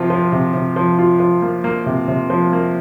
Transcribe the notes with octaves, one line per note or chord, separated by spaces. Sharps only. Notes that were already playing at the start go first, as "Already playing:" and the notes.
Already playing: C3 F3 F4
F3
C3
C3
F3
F4
F3
A#3
A#3
C3
C3
F3
A#3